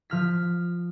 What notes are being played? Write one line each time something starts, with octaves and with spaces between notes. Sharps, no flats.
F3 F6 B6